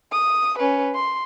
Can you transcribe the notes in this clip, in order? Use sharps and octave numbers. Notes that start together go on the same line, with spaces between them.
D#6
C#4 B4
C6